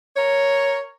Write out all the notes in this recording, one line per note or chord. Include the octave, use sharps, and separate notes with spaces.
A#4 C#5